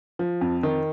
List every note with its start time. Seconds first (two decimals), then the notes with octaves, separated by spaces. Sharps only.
0.19 F3
0.41 F2
0.63 D#3